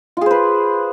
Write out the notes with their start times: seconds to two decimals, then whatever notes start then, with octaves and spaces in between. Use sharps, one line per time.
0.17 F4
0.21 G#4
0.26 C5
0.31 B4